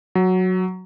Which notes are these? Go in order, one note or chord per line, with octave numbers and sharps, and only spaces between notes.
F#3